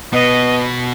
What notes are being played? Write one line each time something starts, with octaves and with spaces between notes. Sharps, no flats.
B2 B3 D#5